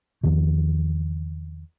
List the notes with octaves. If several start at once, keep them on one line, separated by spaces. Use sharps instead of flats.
E2 D#3 F3